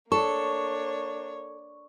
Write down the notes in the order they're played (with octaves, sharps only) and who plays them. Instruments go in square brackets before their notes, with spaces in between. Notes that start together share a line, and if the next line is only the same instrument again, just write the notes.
[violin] A#3 C#5 [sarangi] D4 [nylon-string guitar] A4 [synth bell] C#6